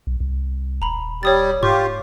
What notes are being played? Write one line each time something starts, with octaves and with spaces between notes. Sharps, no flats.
B1
C2
D#1 A#5 B5
G3 C#5 D#6 A6
G#2 F4 G4 C#6